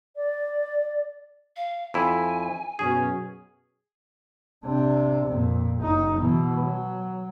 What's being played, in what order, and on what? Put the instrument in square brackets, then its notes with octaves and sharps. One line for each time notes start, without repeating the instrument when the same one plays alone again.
[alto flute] D5
[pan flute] F5
[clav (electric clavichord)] F2 E4 [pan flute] G#5
[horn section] F#2 B2 C#4 [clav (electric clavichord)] G#4
[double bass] C3 D4
F2 A#2
F#1 D#4
B2 E3
F#3